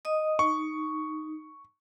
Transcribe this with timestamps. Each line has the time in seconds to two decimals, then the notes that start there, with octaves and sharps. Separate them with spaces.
0.05 D#5 D#6
0.39 D#4 C#6